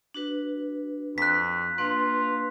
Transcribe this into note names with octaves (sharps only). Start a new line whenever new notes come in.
D4 F#4 B4
F2 F#6 B6
A#3 D4 F4 B4